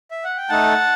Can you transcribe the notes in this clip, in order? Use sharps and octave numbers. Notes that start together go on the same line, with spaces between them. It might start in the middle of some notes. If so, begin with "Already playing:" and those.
E5
F#5
G5
A3 D#4 A4 F#5 A5